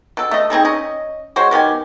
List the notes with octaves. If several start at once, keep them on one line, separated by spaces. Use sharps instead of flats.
B2 A4
A3 D#5
C4 D#4 G#4 A4
C#4 D#5
G#3 F#4 C5 C#5
B2 D#3 G4 G#5